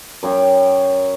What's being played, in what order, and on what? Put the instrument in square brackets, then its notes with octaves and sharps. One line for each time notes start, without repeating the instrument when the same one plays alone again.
[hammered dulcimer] F#2 C#5 G5